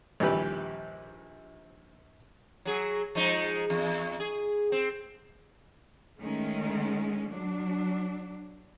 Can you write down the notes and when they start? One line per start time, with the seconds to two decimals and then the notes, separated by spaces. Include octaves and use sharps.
0.20 A#1 D#2 E3 G3 G4 B4
2.65 F#3 G#4
3.15 F3 G#3 D#4
3.70 E2
4.20 G#4
4.72 C4
6.20 D#3 G#3 A3 C#4
7.30 F#3 D4